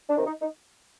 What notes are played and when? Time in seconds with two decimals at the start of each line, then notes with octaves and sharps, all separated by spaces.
0.09 D4
0.17 C3 D#3
0.26 D#4
0.41 D#4